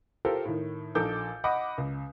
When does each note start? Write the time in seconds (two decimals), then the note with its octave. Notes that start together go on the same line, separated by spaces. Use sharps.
0.25 F4 G4 A4 A#4 C5 F5
0.45 A2 D#3
0.95 A#1 D#4 A4 D6 G6
1.44 D#5 F#5 B5 D6 D#6
1.78 C#2